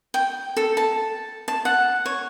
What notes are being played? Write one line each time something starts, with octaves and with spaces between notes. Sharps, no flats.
G5
A4
A5
A5
F#5
C#5